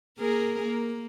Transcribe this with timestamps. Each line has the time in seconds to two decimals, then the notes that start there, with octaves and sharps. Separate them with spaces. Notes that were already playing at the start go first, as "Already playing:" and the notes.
0.19 A#3 G#4 A#4
0.63 A#3